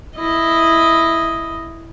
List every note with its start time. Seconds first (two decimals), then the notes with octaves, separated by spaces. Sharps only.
0.16 E4 D#5